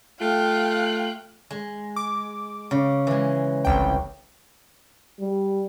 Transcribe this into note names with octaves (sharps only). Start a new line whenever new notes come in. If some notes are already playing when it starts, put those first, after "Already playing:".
A3 F4 F5 G5 F#6
G#3
D6
C#3
E3 G#3
G1 C2 G5
G3